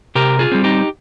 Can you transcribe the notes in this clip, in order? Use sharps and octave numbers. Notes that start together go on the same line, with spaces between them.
C3 G4 A#4
F4 G#4
G3 C4
D#4 G4